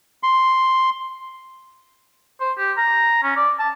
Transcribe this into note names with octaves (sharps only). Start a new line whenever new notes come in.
C6
C5
G4
A#5
C#4
D5
A5